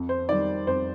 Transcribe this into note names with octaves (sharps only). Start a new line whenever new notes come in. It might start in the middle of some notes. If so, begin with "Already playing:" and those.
Already playing: F2
C5
D#3 G3 D5
F2 C5